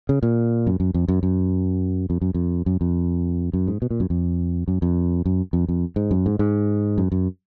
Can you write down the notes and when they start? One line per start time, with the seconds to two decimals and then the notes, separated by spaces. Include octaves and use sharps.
0.09 C#3
0.23 A#2
0.67 F#2
0.80 F#2
0.94 F2
1.08 F#2
1.23 F#2
2.10 F2
2.22 F#2
2.34 F2
2.66 F#2
2.81 F2
3.53 F#2
3.67 G#2
3.82 B2
3.90 A#2
4.00 F#2
4.10 F2
4.68 F#2
4.82 F2
5.26 F#2
5.53 F2
5.68 F2
5.96 G#2
6.11 F#2
6.26 G#2
6.39 G#2
6.98 F#2
7.12 F#2